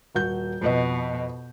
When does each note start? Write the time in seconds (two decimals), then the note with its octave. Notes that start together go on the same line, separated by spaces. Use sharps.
0.15 D#1 F#4 G6
0.61 F2 B2 B4 D#5